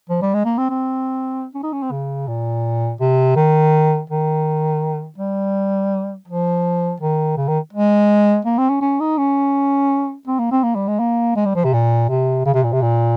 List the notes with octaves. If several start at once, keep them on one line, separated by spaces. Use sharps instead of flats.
F3
G3
G#3
A#3
C4
C4
C#4
D#4
C#4
C4
C#3
A#2
C3
D#3
D#3
G3
F3
D#3
C#3
D#3
G#3
A#3
C4
C#4
C#4
D#4
C#4
C4
A#3
C4
A#3
G3
G#3
A#3
G#3
G3
F3
C3
A#2
C3
C#3
C3
A#2
C3
A#2